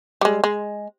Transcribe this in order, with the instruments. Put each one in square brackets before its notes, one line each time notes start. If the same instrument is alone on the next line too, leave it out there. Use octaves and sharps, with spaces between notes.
[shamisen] G3 G#3
G#3